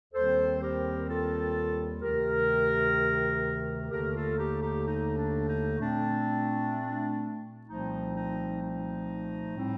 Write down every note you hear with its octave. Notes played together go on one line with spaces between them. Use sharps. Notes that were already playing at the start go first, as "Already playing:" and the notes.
D#2 D#3 G3 C4 A4 C5
G4 A#4
F4 A4
D2 C3 D#3 G4 A#4
D#2 D3 A3 G4 A#4
F4 A4
D#4 G4
D#4 G4
D#4
D4
D#4
A#2 A3 C4 D4
C2 A#2 F3 A3 C4 D#4
D#4
D#4
A2 G3 C4